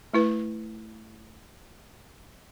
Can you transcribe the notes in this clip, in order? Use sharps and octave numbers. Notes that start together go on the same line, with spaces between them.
A3 E4 B4